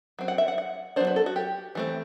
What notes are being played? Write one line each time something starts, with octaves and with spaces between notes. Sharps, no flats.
F#3 C4
F#5
E5
F#5
F#5
F#3 B3 D4 C5
B4
A4
F#4
G4
E3 A3 C4